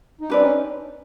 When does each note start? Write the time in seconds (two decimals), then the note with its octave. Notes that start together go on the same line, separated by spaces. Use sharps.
0.21 D#4
0.30 C4 D4 G4 B4 D5
0.41 C#4 D#4